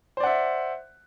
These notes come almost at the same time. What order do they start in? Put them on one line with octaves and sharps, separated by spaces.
C5 D5 F#5 E5